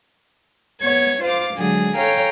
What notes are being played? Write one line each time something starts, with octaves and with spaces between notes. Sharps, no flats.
B3 C#5 G#6
F4 C5 F5 D6
D3 F#3 G#3 G#4
A4 C#5 F5 G5 G#5 A#5